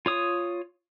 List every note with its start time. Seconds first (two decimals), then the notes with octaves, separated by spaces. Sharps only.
0.06 F4 C#5 D#6